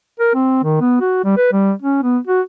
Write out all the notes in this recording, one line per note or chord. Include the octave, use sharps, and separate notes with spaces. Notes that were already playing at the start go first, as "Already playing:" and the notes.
A#4
C4
D#3
B3
F#4
G3
B4
G3
C#4
B3
F#4